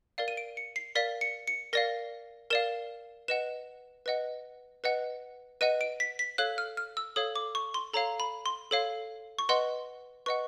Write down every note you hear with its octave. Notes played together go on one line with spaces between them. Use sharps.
A#4 D5 F5
D#7
D7
C#7
C7
A#4 D5 F5 B6
C#7
C#7
A#4 D5 F5 A#6
A#4 D5 F5 E7
B4 D#5 F#5 E7
B4 D#5 F#5
B4 D#5 F#5
B4 D#5 F#5 D#7
D7
B6
B6
A4 C#5 F5 F#6
F6
F6
E6
A4 C#5 F5 D#6
D6
C#6
C6
A4 C#5 F5 A#5
B5
C6
A4 C#5 F5
C#6
B4 D#5 F#5 C6
B4 D#5 F#5 C#6